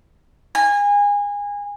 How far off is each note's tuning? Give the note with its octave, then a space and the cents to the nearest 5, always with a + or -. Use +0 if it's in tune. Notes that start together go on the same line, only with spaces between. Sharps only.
G#5 -25